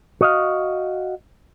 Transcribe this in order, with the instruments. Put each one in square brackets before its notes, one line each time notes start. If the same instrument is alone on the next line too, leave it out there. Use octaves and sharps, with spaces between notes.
[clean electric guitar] F#4 D#5 F5